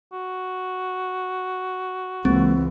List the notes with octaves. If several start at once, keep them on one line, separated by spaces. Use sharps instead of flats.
F#4
C#2 E3 G#3 A#3 C4